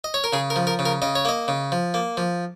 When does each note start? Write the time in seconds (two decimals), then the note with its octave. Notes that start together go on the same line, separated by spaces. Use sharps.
0.04 D#5
0.14 C#5
0.24 A#4
0.33 C#3 G#4
0.50 A#4
0.56 F3
0.67 A#4
0.79 C#3
0.86 A#4
1.02 C#3 D#5
1.15 C#5
1.25 A#3 D#5
1.48 C#3
1.72 F3
1.94 A#3
2.17 F3